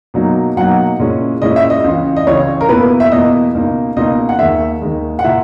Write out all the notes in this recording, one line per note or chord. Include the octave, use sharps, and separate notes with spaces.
B2 F#3 A#3 D#4
B2 F#3 A#3 D#4 F#5
A#2 G#3 C#4 E4
A#2 G#3 C#4 E4 D#5
E5
D#5
C#2 C#3 E3
D#5
C#2 C#3 E3 C#5
A#4
E2 B2 A#3 E4 B4
E5
E2 B2 A#3 E4 D#5
C#2 B2 A#3 D#4
C#2 B2 A#3 D#4 D#5
F#5
D#2 D#3 G#3 E5
D#2 D#3 G#3
F#5
A#2 A#3 E4 E5